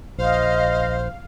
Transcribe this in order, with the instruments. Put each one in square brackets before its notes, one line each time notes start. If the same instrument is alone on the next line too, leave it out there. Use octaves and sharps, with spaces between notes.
[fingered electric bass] A#1 [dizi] C5 [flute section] D#5 [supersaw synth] F5